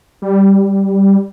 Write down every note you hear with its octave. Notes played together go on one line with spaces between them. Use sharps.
G3